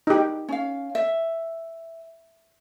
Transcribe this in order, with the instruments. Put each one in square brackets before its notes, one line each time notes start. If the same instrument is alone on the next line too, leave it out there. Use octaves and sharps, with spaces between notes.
[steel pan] D#4 G4
[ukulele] C#4 F5
E5